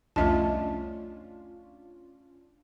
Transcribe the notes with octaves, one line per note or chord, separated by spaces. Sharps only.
C2 F2 A3 C#4 D4 F4 D#5 A5